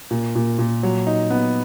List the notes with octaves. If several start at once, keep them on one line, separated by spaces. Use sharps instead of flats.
A#2
A#2
A#2
F#3
D#4
B3